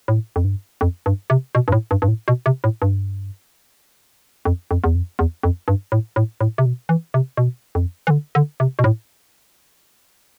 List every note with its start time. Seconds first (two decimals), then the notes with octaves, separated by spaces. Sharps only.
0.08 A2
0.36 F2
0.44 G2
0.81 F2
1.06 G2
1.30 C3
1.55 B2
1.68 G2
1.72 A2
1.91 G2
2.02 G2
2.08 A2
2.28 B2
2.46 C3
2.64 A2
2.82 G2
4.45 F2
4.71 F2
4.84 E2
4.95 F2
5.19 E2
5.43 F2
5.68 G2
5.92 A2
6.16 A2
6.41 A2
6.58 C3
6.66 B2
6.89 E3
7.14 C3
7.37 B2
7.75 F2
8.07 E3
8.10 D3
8.35 D3
8.60 C3
8.79 B2
8.84 A2